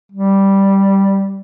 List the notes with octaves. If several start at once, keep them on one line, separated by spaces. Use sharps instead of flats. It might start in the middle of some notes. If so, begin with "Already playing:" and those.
G3